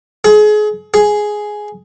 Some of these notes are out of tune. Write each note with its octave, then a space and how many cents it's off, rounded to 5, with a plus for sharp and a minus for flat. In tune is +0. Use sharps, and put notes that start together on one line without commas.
G#4 +30
G#4 +5